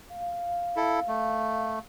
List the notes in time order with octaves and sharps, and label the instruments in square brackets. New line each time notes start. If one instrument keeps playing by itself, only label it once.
[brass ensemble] F5
[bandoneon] E4 A4
A3